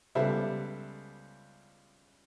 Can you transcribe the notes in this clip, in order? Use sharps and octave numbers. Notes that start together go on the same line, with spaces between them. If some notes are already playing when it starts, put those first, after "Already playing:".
C#2 G3 B3 A4 C5 E5